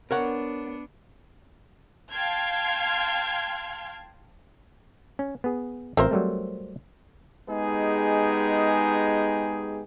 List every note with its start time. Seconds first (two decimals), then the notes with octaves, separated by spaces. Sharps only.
0.11 B3 D4 A#4 C#5 F#5
2.11 F5 G5 A5 C6 F6 G#6
5.19 C#4
5.44 B3 G#4
5.97 A1 C4 F4 A#4 C5 E5
6.11 F#3 G3 A3
7.49 G#3 B3 D#4 G4 G#4